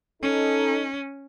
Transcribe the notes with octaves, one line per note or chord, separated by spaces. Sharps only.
C#4 D#4 A4